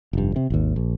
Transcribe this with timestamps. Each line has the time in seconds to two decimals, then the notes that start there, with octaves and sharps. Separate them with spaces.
0.13 F1 G2
0.36 C3
0.50 G#1 D#2
0.76 A#1